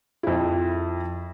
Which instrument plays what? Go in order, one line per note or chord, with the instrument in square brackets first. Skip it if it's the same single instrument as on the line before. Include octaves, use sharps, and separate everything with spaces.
[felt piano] F2 E4